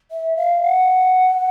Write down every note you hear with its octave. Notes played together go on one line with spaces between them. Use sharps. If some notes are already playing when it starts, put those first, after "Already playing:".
E5
F5
F#5